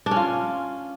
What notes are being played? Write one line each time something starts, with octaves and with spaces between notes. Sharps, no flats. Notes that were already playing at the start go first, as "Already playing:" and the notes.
D4
C#4
F4